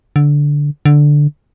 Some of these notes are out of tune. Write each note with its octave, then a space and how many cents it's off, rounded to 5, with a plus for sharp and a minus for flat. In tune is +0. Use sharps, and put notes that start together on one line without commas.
D3 -10
D3 +0